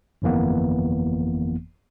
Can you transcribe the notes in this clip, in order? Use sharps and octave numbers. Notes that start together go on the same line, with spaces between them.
G1 F2 E3 A#3 B3